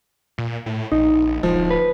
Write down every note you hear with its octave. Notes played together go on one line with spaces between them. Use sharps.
A#2
A2
A#1 D#4
D1 F3
B4